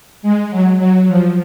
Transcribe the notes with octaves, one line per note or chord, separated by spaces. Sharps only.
G#3
F#3
F#3
F3